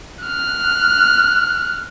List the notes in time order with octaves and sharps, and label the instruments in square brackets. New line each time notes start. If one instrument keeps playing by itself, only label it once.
[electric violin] F6 F#6